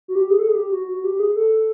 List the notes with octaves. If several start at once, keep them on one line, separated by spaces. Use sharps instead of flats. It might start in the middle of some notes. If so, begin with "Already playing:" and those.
F#4
G4
G#4
A4
G#4
G4
F#4
F#4
G4
G4
G#4
A4